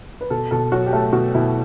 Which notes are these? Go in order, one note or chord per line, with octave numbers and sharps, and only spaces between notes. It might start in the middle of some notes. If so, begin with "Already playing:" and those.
B4
B2 A4
B2 A4
F#3 F#4
G4
A3 A4
B2 F#4
B2 E4